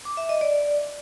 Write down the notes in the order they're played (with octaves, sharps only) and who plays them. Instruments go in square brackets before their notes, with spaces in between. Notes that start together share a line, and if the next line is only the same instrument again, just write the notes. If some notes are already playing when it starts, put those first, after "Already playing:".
[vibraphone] D6
E5
D#5
D5